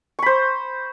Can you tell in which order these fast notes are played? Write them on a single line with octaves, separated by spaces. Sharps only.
C#6 B5 C5